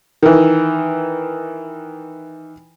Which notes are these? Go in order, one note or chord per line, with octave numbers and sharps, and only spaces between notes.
D#3 E3